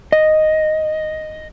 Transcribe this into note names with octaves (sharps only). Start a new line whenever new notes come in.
D#5